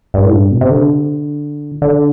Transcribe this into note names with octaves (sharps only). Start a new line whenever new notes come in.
G2
A2
G2
B2
C3
D3
D3